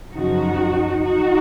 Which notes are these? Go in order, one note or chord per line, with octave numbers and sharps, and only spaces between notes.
F#2 C#3 F3 D#4 F#4
D#4 F#4